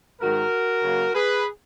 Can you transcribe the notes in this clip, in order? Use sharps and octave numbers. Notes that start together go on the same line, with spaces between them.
G#2 D#3 G#3 F#4 A#4
C#3 F#3 A#3
G#4 B4